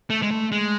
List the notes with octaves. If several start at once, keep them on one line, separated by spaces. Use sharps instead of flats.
A3
G#3
A3
G#3